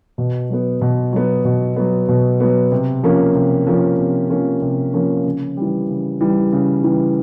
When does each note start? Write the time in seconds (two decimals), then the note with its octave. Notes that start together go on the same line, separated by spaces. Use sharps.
0.18 B2
0.49 F#3 B3
0.81 B2
1.13 F#3 B3
1.45 B2
1.76 F#3 B3
2.09 B2
2.40 F#3 B3
2.72 C3
3.03 F3 A#3 C#4
3.35 C3
3.67 F3 A#3 C#4
3.99 C3
4.30 F3 A#3 C#4
4.62 C3
4.94 F3 A#3 C#4
5.25 C#3
5.57 E3 G3
5.89 C#3
6.21 E3 G3
6.52 C#3
6.84 E3 G3